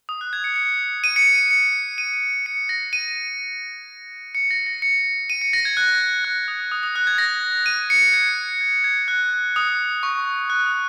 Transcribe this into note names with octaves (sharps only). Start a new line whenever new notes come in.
D#6
F#6
G#6
C#7
C#7
D#7
C#7
D#7
C#7
D#7
C#7
A#6
D#7
C#7
A#6
A#6
C#7
D#7
C#7
A#6
G#6
F#6
F#6
D#6
D#6
D#6
F#6
G#6
A#6
D#7
C#7
G#6
G#6
G#6
F#6
D#6
C#6
F#6
D#6